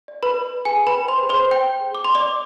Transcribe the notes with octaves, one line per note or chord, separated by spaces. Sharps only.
D5
B4 B5
D5
G#4 G#5
B4 B5
G5
C5 C6
G#4
C5 C6
G5 G6
G#4
D6
D5 C6
D5 D6